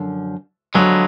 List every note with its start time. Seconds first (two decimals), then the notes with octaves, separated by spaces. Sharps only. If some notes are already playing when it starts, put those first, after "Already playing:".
Already playing: F#2 D3 F3
0.75 D3 F3 F#3 G#3 B3